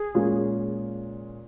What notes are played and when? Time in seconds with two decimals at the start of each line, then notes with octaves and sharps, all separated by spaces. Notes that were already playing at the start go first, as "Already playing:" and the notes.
Already playing: G#4
0.14 A#2 G#3 C#4 F4 A#4